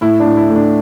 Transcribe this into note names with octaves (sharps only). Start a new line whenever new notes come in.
A2 E4
D4
A2
E4
A3
D4